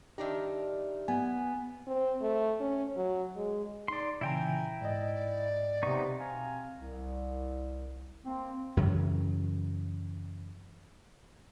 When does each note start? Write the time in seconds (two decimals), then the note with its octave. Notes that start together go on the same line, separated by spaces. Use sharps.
0.18 D#3 D4 D#4 G4 D5 E5
1.08 B3 G#5
1.87 C4
2.21 A3
2.60 C#4
2.96 F#3
3.36 G#3
3.88 D#4 D5 C6
4.21 A#2 C#3 E3 E4 G5 G#5 A#5
4.81 G#2 D5 D#5
5.14 D5
5.83 C3 B3 D#4 C#6
6.19 B2 C4 F5 G#5 A#5
6.78 C2
8.25 A#3 C4
8.77 F#2 C#3 E3 F#3